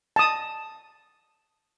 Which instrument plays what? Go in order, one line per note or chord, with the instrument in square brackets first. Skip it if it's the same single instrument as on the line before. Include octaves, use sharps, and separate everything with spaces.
[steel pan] A5 D#6